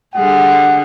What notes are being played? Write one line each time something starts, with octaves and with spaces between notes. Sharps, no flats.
D3 G3 G#4 F#5